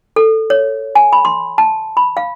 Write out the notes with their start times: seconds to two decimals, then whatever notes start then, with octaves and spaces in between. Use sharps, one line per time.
0.16 A4
0.50 C#5
0.95 G#5
1.13 B5
1.25 C6
1.58 A5
1.97 B5
2.17 F5